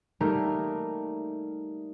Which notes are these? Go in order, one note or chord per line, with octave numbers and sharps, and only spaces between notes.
G3 A3 A#3 D#4 A#4